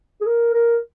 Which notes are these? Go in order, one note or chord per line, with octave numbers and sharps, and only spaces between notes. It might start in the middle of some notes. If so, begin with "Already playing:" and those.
G#4
A#4
A#4